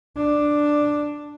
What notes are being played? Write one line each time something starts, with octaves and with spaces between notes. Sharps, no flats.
D4